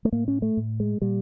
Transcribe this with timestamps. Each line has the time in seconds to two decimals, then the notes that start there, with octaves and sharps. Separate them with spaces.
0.05 A3
0.12 A2 A#3
0.28 C#4
0.42 A3
0.57 A2
0.80 G#3
1.02 A#2 G3